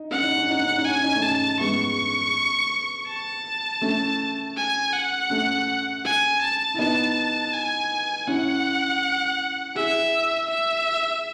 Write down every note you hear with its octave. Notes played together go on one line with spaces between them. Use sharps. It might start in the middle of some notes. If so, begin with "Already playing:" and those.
Already playing: D#4
C#4 F#5
D#4
C#4
D#4
C#4
D#4
C#4 G#5
D#4
A3 C#4
A5
G#3 B3 C#6
A5
A3 C#4
G#5
F#5
A3 C#4
G#5
A5
E4
B3 D#4 A5
G#5
C#4 E4 F#5
E4 G#4 E5
E5